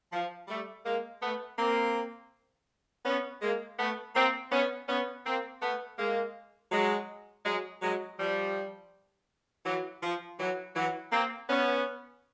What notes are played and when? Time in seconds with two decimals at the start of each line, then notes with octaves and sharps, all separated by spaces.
0.13 F3
0.48 G3 A3
0.85 G#3 A#3
1.22 A3 B3
1.58 A#3 C4
3.06 B3 C#4
3.42 G#3 A#3
3.79 A3 B3
4.16 A#3 C4
4.52 B3 C#4
4.89 B3 C#4
5.26 A#3 C4
5.62 A3 B3
5.99 G#3 A#3
6.72 F#3 G#3
7.45 F#3 G#3
7.82 F#3 G#3
8.19 F3 G3
9.65 E3 F#3
10.03 F3
10.40 E3 F#3
10.76 E3 F#3
11.12 A#3 C4
11.50 B3 C#4